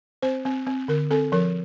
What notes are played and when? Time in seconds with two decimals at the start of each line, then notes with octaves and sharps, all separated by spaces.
0.23 C4 C5
0.45 C4
0.67 C4
0.88 D3 A#4
1.11 C4 A4
1.32 F3 A#4